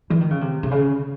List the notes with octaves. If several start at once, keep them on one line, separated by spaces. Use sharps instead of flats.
E3
D#3
C#3
C3
C3
C#3